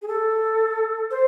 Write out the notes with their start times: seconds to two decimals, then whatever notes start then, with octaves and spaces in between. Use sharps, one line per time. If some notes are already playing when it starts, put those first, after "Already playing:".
0.02 G#4
0.08 A4
1.11 C5